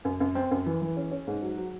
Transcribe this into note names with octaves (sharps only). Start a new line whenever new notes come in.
F#2
F#2
C4
F#2
E3
E3
C#4
C#4
G#2
F#3
F#3